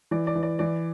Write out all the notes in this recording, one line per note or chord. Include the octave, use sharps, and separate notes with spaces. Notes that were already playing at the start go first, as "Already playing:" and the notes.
E3 D5
D5
E3
D5
E3 D5